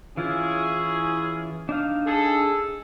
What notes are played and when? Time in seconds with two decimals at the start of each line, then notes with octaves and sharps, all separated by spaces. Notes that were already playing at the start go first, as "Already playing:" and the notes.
0.17 E3 C#4 E4 F4 G#4
1.69 D4 D#4 F5
2.06 G#4 A4